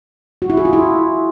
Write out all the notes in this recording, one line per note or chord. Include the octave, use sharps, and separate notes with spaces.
F#4
E4
G#4
F4
E4